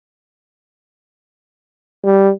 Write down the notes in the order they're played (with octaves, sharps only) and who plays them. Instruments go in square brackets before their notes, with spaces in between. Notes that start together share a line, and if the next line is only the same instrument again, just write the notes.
[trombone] G3